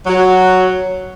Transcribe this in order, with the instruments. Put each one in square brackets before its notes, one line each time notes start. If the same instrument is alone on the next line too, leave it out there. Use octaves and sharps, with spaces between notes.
[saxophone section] F#3